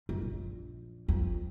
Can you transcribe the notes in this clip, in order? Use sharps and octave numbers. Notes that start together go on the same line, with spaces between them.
F#2
A#1
F2